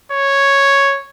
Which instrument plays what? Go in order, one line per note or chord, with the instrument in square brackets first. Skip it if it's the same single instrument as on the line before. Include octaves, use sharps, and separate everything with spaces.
[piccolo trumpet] C#5